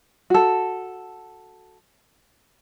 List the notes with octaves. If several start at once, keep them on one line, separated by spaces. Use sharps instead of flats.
F#4 A4